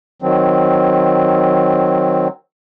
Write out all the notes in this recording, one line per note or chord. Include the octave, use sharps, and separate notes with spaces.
D#3 F#3 C4